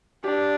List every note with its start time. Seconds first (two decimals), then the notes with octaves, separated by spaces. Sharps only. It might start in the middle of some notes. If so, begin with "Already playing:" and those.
0.24 D4 G4